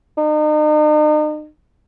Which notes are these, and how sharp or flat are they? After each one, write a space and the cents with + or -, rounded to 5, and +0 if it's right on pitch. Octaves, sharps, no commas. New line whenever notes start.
D#4 -40